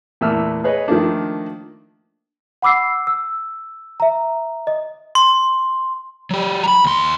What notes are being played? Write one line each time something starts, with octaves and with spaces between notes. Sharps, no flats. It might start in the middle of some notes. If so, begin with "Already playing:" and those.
E2 A#2 A3 E6 F6
G#4 B4 C#5 D#5
D#3 F3 A3 A#3 D4
F#5 B5 D6 E6 C7
E6
E5 A#5
D#5
C6
F#3 G4
A#5 B5
D#2 C6